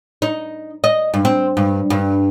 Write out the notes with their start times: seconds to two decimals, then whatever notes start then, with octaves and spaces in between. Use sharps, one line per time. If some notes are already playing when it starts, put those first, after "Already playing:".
0.22 D#4
0.84 D#5
1.14 G2
1.25 C4
1.57 G2
1.90 G2